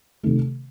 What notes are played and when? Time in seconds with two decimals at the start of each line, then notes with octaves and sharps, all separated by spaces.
0.23 C3 D#3 A3